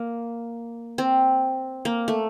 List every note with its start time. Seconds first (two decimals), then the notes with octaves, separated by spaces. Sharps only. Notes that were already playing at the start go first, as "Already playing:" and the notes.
Already playing: A#3
0.98 C4
1.85 A#3
2.08 A3